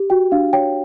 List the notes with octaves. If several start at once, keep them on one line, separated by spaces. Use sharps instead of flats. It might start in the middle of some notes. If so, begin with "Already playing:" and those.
Already playing: G4
F#4 G5
D4 F5
C#5 G5